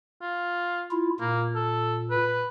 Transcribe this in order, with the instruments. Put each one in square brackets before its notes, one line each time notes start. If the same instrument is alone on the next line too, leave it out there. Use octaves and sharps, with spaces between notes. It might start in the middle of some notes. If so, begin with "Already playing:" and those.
[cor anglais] F4
[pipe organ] E4 F4
[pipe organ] A#2 [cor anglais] A#3
[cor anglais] A4
B4